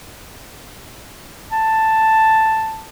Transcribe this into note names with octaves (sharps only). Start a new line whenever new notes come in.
A5